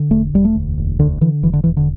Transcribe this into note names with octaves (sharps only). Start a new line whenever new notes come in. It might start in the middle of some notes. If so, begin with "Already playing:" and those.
Already playing: D3
E1 A3
E1 G3
A3
D2
E1
D2 D3
D3 E3
E1 E3
D3
E1 E3
D3